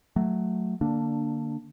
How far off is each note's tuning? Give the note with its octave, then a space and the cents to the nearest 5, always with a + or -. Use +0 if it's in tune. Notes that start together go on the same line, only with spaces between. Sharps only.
F#3 +0 A3 +0
D3 +15 A#3 +0 D4 +0